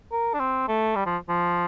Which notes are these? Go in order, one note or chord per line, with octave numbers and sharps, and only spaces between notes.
A#4
D4
C4
A3
G3
F3
F3